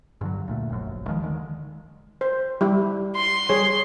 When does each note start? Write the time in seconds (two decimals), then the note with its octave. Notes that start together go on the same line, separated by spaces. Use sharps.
0.21 G2 D3 F#3
0.48 D2 A#2 A3
0.70 F1 A#1 F#2
1.07 D#2 D#3 F3 G#3
1.22 D3 D#3 F#3 G#3
2.21 C5
2.61 G3 E4 G4
3.16 C6
3.49 G3 G#4 C#5